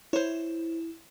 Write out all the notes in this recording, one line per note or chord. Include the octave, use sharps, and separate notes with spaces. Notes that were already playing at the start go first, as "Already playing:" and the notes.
E4 C5 C#5